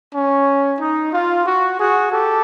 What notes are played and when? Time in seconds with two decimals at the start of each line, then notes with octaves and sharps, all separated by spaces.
0.14 C#4
0.80 D#4
1.13 F4
1.46 F#4
1.79 F#4 G#4
2.12 G4 A4